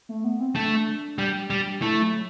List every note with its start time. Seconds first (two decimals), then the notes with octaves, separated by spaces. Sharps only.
0.09 A3
0.24 B3
0.40 C4
0.55 A3 D4
1.18 G3
1.50 G3
1.81 A3 E4
2.02 F#3